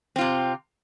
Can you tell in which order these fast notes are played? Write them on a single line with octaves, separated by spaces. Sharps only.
C4 F4 C3